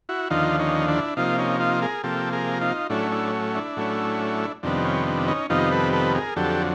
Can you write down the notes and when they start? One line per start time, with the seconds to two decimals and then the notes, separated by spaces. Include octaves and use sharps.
0.09 E4 F#4
0.30 D#2 D3 F3 D#4 F4
0.59 C#4 D#4
0.88 D4 E4
1.17 C3 F3 A#3 D#4 F4
1.38 C#4 D#4
1.60 D#4 F4
1.82 G#4 A#4
2.04 C3 F3 A#3 G4 A4
2.32 G#4 A#4
2.61 D#4 F4
2.90 A2 F#3 A3 C#4 D4 E4
3.12 D4 E4
3.55 D4 E4
3.77 A2 F#3 A3 C#4
4.63 F2 C3 D#3 G3 B3 D4
4.84 C#4
5.06 D4
5.28 C#4 D#4
5.49 F2 C3 D#3 G3 B3 D#4 F4
5.71 A4 B4
5.93 A4 B4
6.15 G#4 A#4
6.36 F2 D3 F#3 G4 A4